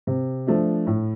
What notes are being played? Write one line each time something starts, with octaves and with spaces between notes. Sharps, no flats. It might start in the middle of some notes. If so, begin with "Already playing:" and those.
C3
F3 A3 D4
A2